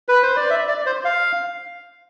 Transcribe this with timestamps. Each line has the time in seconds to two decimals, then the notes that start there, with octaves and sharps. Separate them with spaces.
0.09 B4
0.23 C5
0.36 D5
0.50 E5
0.68 D5
0.86 C5
1.05 F5